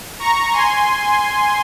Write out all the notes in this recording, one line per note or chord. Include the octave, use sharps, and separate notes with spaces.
A#5 C#6
G#5 C6